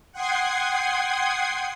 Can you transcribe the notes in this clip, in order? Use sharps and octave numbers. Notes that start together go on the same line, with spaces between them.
F#5 G5 C6 D#6 G#6 C7